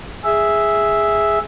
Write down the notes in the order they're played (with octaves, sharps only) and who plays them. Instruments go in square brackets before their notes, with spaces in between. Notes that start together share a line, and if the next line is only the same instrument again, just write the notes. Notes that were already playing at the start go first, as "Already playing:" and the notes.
[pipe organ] G#4 E5